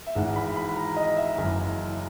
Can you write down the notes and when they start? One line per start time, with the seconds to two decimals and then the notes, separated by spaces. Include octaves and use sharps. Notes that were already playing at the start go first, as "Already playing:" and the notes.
0.07 E5
0.15 G#1 G#2 E3 F#5
0.36 B5
0.56 B5
0.76 A#5
0.96 D#5
1.17 E5
1.38 F#1 F#2 E3